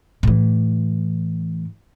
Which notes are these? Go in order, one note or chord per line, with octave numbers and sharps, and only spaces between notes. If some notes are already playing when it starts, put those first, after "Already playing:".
A2 E3